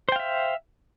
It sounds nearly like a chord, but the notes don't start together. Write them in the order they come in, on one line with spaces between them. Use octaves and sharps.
C5 G5 F5 E5